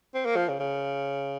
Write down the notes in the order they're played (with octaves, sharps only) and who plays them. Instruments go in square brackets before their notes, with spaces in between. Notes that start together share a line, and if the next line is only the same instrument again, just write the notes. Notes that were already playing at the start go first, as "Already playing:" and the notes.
[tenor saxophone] C4
A#3
F3
C#3
C#3